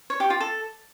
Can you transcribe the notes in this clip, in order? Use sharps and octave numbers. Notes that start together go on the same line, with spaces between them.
C#5
G4
F4
A4